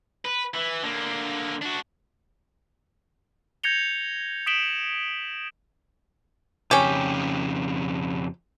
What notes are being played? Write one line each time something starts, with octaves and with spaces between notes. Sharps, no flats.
B4
E3
D3 A#3
D4 F#4
G6 G#6 A#6 C#7 F7 G7
D#6 B6 D7 E7 F#7 G7
F2 C#3 C#4 G4